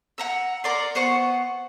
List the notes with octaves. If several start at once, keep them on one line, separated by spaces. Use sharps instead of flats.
F#5 A#5 E6
A#4 D5 C6
B3 C5 F#5 C#6